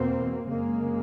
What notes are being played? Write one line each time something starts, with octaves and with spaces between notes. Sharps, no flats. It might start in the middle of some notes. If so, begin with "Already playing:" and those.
Already playing: E2 B2 A#3 C4
F#2 C#3 G#3 A#3